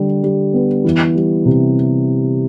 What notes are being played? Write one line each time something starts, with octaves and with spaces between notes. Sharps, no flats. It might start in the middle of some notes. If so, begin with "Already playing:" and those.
Already playing: D3 G3
G3
B3
E3
G3
C3